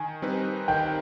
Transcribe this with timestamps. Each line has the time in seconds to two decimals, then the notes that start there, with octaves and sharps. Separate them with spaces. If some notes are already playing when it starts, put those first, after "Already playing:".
Already playing: D#3 G#5
0.22 G3 C4 D#4 B4
0.68 D#3 G5